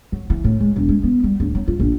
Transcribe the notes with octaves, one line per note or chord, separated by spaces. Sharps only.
F#3
E3
A2
G#3
E1
G#3
B3
G3
D1
F#3
F4
A#1